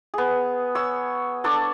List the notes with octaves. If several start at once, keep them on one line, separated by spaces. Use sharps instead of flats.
B3 G#4
C#5 E6
D4 A4 C#5 D5